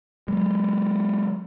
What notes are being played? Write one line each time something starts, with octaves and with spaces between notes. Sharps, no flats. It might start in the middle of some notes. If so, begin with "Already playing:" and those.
F#3 G#3